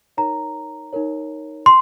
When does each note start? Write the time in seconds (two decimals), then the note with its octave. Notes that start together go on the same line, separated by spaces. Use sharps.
0.17 D#4 A#4 C#5 A#5
0.93 D#4 A#4 C#5
1.66 C6